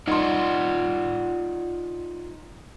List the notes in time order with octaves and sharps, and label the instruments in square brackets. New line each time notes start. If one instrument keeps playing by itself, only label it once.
[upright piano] D#4 C6 [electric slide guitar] F4 D5 F#5